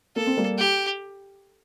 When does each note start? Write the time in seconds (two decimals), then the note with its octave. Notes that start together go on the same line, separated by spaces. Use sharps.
0.16 A#3 A4
0.27 C4
0.37 G3 A#3
0.58 G4